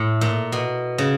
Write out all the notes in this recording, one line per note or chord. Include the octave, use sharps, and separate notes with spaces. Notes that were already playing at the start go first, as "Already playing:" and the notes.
Already playing: A2
A#2
B2
C#3